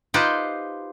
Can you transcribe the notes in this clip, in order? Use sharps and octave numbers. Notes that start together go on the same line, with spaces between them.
D#4 F4 G4 B4 C5